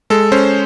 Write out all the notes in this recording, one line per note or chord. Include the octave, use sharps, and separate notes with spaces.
G#3 A4
C#4 C5